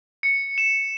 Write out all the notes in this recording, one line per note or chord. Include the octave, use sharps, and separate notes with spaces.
C#7
E7